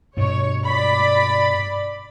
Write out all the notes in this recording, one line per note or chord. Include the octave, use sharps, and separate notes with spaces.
G2 B2 C#5
D5 B5